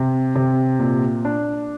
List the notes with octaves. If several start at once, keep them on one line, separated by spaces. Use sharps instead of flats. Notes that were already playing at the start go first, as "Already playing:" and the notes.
Already playing: C3
C3
A#2
D4